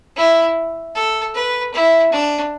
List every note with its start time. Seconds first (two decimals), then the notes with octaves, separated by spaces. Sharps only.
0.16 E4
0.95 A4
1.35 B4
1.74 E4
2.12 D4